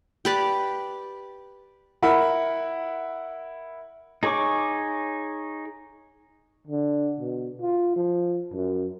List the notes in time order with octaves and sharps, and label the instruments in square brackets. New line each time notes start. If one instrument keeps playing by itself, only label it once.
[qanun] G4 B4 D5
[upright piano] E4 A#4 F#5 B5
[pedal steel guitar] D#4 G#4 C#5 C#6 D6
[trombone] D3
B2
F4
F3
F#2